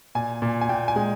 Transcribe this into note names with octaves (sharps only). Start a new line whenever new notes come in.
A#2 G#5
A#2
G#5
A#2 G5
G#5
G#3